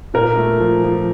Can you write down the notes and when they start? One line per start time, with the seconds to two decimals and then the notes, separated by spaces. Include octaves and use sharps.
0.14 A#2 A#4
0.37 A3
0.60 F3
0.84 F3